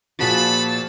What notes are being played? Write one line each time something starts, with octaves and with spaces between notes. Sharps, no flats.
A#2 F3 F#4 G#4 A5 B5 A6